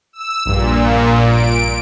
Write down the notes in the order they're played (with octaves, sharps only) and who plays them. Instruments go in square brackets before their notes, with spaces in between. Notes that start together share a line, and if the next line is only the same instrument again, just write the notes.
[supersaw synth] E6
[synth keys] A#1 G2 [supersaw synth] A#2
[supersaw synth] D7